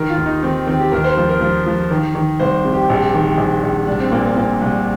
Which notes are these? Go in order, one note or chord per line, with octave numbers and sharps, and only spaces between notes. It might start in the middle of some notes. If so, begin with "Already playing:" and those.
Already playing: D#3 A#4
F4
D#2
D#4
D#3 C4
D#3 C4
G4
D#2 A#4
C5
F3
A#4
F3
F3
D#3
D#3
C2 C5
C3
G4
A#1
D#3
A#1
A#1
C2 D4
C4
A#2 A#3
A#3
A#2 A#3
C2